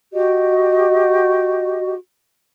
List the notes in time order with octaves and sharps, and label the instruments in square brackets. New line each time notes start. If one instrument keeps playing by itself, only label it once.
[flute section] F#4 G4 D#5